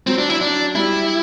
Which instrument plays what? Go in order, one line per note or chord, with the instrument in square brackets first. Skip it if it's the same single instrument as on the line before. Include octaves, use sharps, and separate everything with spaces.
[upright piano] F#3 [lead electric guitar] C4
[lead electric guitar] D4
E4
D4
[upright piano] G3 [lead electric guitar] E4